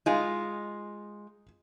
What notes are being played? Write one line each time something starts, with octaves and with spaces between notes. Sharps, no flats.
G#3 D#4 F4 G#5